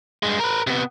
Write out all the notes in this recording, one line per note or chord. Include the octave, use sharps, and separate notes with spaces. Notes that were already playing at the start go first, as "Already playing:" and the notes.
G2 G#3
A#4 B4
C3 B3